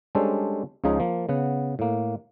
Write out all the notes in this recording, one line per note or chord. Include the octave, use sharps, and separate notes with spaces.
G3 G#3 C#4 D4 A4 C5
C#2 C#3 F3 D#4 G#4
F3 A#3
C#3 B3 F#5
A2 A#3